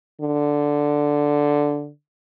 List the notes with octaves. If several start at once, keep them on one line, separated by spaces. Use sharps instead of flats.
D3